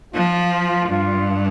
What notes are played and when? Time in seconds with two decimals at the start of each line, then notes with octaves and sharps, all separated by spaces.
0.14 F3 F4
0.89 G2 F4